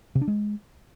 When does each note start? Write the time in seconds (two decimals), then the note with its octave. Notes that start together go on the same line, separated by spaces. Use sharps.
0.15 C3
0.21 D4
0.28 G#3